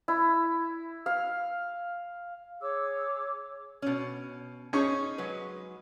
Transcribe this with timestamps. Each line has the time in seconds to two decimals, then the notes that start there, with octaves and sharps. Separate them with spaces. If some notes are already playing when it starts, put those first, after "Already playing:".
0.08 E4
1.06 F5
2.60 G#4 C#5 D6 E6
3.82 B2 C#4
4.73 C#4 D#4 G#4 C#6
5.18 F#3 G#3 B4